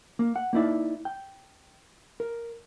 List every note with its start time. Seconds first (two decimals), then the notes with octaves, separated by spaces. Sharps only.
0.19 A#3
0.36 F#5
0.53 A#3 D#4 E4 D5
1.05 G5
2.20 A#4